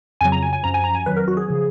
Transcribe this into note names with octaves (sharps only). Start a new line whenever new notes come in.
F2 C#3 F#3 G#5
A#5
G#5
G#5
F#2 F3 A#5
G#5
A#5
G#5
F2 D#3 F#3 B4
A#4
F#4
G#4
C#3 F3